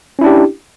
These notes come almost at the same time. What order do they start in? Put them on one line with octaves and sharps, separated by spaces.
C#4 E4 D4 G4